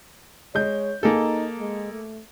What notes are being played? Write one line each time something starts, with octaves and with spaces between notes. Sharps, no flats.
G#3 C#5 G6
A#3 D#4 G#4 A4
G#3
A3